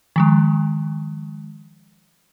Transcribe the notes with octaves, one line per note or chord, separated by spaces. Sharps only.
D#3 F3 G#3